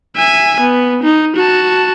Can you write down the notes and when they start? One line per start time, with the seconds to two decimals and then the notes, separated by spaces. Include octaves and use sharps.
0.16 E5 G#5
0.61 B3
1.03 D#4
1.36 F#4 A5